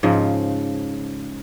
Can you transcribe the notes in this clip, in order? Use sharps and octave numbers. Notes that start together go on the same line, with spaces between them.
G#2 C#3 F3